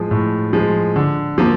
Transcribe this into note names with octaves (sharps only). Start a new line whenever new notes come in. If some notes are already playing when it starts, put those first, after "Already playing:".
Already playing: A2 F3 G#3
A2
F3 G#3
D3
F3 A#3